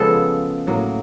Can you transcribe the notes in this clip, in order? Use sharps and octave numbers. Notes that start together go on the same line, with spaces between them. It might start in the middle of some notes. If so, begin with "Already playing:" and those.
Already playing: C#3 F3 G#3 B3 A4
A2 F#3 A#3